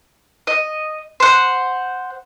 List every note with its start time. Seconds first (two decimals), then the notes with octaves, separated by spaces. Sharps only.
0.47 D#5
1.20 C5 F#5